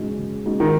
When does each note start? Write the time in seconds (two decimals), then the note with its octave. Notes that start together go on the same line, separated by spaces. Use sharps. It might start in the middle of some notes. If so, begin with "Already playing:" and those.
Already playing: C#3 G#3 D#4 F#4
0.19 C#3
0.45 G#3 D#4 F#4
0.60 D#3